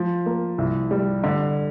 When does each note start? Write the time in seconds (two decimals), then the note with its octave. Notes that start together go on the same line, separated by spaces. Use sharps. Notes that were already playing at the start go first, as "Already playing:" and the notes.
Already playing: F3
0.26 A#3
0.58 C2
0.91 G3
1.24 D3